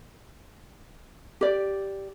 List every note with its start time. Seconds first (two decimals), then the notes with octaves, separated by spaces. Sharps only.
1.41 G4 D5